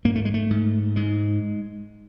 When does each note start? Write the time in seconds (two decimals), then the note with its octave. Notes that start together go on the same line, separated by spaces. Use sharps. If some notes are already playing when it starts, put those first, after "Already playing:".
0.05 G#2 A#3
0.16 A3
0.25 G#3
0.34 A3
0.51 G#2
0.96 G#2 G#3